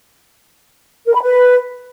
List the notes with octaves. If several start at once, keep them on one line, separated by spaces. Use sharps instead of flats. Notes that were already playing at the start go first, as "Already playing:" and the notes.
A#4
B5
B4